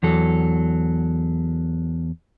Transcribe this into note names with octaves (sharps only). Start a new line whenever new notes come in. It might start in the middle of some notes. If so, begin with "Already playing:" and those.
E2 F#3 A4